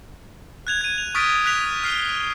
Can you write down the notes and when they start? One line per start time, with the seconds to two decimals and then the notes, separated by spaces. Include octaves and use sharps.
0.67 F#6 G#6 F7
0.81 G#6 D#7
0.98 F7
1.15 C#6 D#6 F6 A6 B6 D7
1.46 F#6 B6 F7
1.84 F6 C7 G7